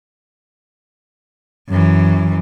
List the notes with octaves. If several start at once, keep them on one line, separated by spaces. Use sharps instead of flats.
F#2 E3